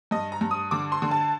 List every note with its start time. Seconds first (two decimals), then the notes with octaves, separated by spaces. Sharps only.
0.11 G2 D#5
0.32 A#5
0.41 G2
0.51 D#6
0.71 D3 D6
0.92 C6
1.02 D3
1.11 A5